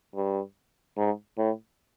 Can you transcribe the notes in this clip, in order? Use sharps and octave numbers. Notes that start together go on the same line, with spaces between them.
G2
G#2
A2